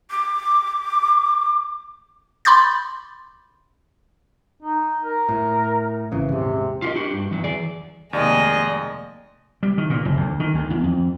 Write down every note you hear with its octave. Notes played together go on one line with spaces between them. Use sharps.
D6
B5 C6 D6 G6 A6
D#4
A#4
A2
G#1 C#3 E3
D#1 G#2 C3
F4 G4 A4 A#4 D#5
D4 F#4 G4
G2
E2 F#3
E3 G#4 D5
F1 D#2 G#3 A#3 D5 D#5
G3
D#3
A#2
F#1
D2
D#3
D2
E2
F2